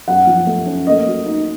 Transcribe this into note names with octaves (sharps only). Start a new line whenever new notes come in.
F#2 F#5
F3
A3
C#4
A#3 D#5
F#3
D#4